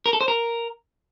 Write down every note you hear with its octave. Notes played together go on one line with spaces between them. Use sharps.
A#4
A4
C5
A#4